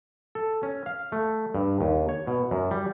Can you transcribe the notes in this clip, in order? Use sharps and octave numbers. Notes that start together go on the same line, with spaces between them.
A4
C#4
F5
A3
G2
D#2
C#5
B2
F#2
G3